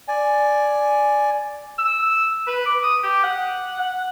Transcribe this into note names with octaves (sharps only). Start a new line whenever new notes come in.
D5 G#5
E6
B4
D6
D#6
G4
F#5
F#5